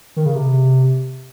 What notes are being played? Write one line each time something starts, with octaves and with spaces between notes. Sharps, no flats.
D#3
C#3
C3